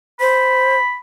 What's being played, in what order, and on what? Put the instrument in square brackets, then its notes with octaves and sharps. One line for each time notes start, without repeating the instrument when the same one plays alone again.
[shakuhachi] C5 [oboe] B5